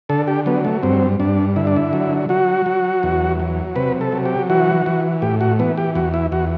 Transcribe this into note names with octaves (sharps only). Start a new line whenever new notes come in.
D3 A4
G4
F#3 B3
A3
G2 C4
G2 D4
D3 E4
D4
E4
F#3
F#3 F#4
F#3
E2
F#3
C3 B4
A4
F#3
G4
E3 F#4
E3
A2 G4
F#4
E3 B3
G4
E2 F#4
E4
E2 F#4